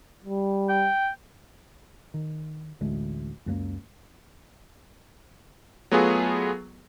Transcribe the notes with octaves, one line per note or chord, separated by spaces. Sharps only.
G3
G5
D#3
A1 D2 G#3
C#2 F#2 F#3 A#3
F#3 A3 B3 F4 F#4 G#4